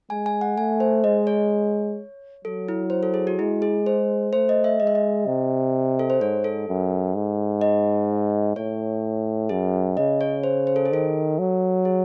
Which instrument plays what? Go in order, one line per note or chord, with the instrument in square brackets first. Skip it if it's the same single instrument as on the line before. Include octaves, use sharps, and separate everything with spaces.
[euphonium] G#3 [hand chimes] G#5
[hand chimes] G#5
F#5
[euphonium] A3 [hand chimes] G#5
[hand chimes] C5
[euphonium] G#3 [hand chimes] D#5
[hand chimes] C#5
[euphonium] F#3 [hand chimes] A4
[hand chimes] E4
C5
A4
G#4
F#4
[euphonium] G#3 [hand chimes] E4
[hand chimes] G#4
C5
[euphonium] A3 [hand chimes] C5
[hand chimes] D#5
E5
[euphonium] G#3 [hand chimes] D#5
[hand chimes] E5
D#5
[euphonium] C3
[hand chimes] A4
C5
[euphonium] G#2 [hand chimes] C#5
[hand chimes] A4
[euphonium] F#2
G#2
[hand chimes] D#5
[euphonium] A2 [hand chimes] C#5
[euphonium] F#2 [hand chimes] G#4
[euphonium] C#3 [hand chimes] D#5
[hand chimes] C#5
C5
C5
A4
G#4
[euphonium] D#3 [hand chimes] A4
[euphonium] F#3
[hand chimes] G#4